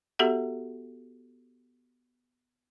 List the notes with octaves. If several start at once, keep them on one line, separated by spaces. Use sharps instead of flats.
B3 F#4 G4 A4 E5 F#5